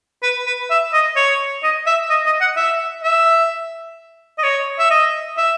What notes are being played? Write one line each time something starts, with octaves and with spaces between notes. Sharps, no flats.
B4
B4
E5
D#5
C#5
D#5
E5
D#5
D#5
F#5
E5
E5
D#5
C#5
E5
D#5
E5